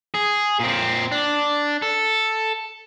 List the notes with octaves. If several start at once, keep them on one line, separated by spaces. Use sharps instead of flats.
G#4
A#2 C4
D4
A4